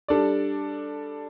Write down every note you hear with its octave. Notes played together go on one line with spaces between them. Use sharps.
G3 D4 A4 D5